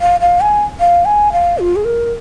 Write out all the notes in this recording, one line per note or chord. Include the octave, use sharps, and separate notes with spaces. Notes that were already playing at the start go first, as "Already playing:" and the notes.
F5
F5
G#5
F5
G#5
F5
F4
G#4
A#4